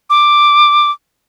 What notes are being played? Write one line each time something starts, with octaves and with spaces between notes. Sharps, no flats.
D6